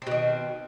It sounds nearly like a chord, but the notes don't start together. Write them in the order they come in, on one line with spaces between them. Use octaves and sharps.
C4 B2 D#3